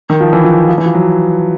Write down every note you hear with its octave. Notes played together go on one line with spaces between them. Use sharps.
D#3
F3
E3
F3
F3
E3
F3
F#3